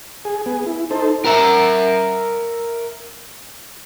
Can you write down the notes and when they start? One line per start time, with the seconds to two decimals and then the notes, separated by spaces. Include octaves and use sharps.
0.25 G#4
0.46 B3 G#4
0.66 E4
0.91 D#4 A4 C5
1.26 A#4 E5